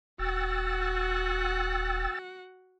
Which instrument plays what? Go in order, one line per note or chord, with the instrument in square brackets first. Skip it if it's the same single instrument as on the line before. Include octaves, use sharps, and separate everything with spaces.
[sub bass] D#1 [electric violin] F#4 F#5 [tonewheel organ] G5 E6 A6